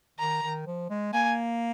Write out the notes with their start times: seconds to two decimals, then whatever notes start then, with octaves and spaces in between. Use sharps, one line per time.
0.19 D#3 A#5
0.43 D#3
0.66 F3
0.90 G#3
1.13 A#3 G#5